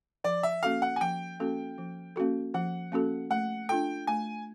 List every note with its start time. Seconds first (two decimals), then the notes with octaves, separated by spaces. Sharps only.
0.24 F3 D5
0.43 E5
0.63 A#3 C#4 F#4 A4 F5
0.82 F#5
0.96 G#5
1.01 F3 G5
1.40 A#3 C#4 F#4 A4
1.78 F3
2.16 A#3 C#4 F#4 A4
2.54 F3 F#5
2.92 A#3 C#4 F#4 A4
3.30 A3 F#5
3.69 D4 F4 A4 G5
4.07 A3 G#5